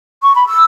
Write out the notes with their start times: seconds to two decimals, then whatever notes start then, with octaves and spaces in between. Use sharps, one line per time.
0.23 C#6
0.35 B5
0.47 E6